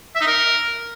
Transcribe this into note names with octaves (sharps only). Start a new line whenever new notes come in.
E5
D#4
A#4